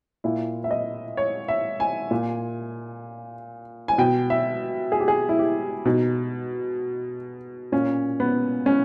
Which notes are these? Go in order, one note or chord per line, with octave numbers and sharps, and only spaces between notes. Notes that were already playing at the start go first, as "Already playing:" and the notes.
A#2 E4
E5
D#5
C#5
E5
G#5
A#2
G#5
B2 G5
E5
G#4
G4
G#4
E4
G4
B2 D#4
A#2 C#4
B3
C#4